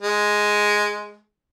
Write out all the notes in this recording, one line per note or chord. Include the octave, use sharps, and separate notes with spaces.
G#3